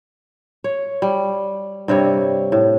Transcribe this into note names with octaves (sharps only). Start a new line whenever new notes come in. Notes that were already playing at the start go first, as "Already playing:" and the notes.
C#5
G3
G2 C3 G3 C#5
A2